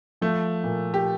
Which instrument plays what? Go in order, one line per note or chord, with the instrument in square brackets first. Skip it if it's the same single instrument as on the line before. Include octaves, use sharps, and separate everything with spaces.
[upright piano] F3 [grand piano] A3
[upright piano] A#2
[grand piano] G4